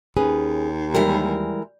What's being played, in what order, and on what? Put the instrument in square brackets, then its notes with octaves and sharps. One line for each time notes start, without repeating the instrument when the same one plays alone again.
[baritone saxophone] D#2 [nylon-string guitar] C#4 G#4 B4
[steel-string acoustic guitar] E3 G#3 A#4 [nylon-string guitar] G3